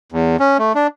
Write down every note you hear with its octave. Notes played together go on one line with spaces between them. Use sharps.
E2
C#4
A3
D4